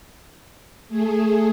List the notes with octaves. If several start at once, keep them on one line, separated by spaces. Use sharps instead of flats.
A3 G#4